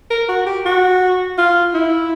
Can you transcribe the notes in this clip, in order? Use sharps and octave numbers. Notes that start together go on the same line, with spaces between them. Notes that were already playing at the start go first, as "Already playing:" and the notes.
A#4
F#4
G4
F#4
F4
E4